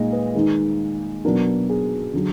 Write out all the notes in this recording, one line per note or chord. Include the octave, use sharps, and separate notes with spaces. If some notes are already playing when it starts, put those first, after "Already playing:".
Already playing: A#2 G#3 D#4 D#5
B4
D#3 G#3 D#4
B2 F#3 B3 D4 A#4
G#4
D3 F#3